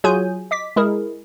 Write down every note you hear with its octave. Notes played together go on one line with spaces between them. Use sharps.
F#3 F4 F#4 G#4 G#5 G6
D#5 D6 B6
G#3 E4 G#4 A#4